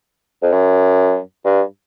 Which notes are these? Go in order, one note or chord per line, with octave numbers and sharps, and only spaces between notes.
F2
F#2
G2